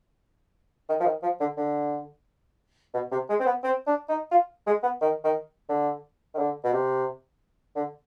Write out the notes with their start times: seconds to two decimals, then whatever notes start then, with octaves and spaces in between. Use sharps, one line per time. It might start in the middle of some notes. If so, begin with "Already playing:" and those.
0.89 D#3
1.00 F3
1.05 D#3
1.23 F3
1.40 D3
1.58 D3
2.94 B2
3.12 C3
3.29 G#3
3.40 C4
3.46 B3
3.64 C4
3.87 D4
4.09 D#4
4.31 F4
4.67 G#3
4.83 B3
5.01 D#3
5.24 D#3
5.69 D3
6.34 D#3
6.38 D3
6.64 B2
6.73 C3
7.76 D3